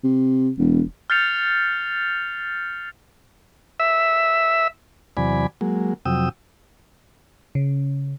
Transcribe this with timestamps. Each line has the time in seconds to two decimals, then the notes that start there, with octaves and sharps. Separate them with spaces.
0.04 C3
0.58 E1
1.10 F6 G6 A6 C7 C#7 F7
3.80 E5
5.17 E2 C3 F#3 D5 G#5 B5
5.61 F#3 G#3 A#3
6.05 F2 C3 F#3 G5 D#6 E6
7.55 C#3